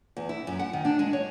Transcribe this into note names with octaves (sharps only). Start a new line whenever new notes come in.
E2
E4
F#2
F#5
D#3
D4
G#3
C#5